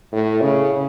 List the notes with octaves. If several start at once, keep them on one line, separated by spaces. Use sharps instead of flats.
A2
C#3